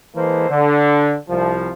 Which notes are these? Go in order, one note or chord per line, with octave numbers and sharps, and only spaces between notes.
E3 G#3 A#3 A4 B4 C5
D3
C2 F3